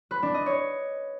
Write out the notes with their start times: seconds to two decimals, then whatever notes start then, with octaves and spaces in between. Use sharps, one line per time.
0.11 B4
0.23 D4
0.34 D#5
0.46 C#5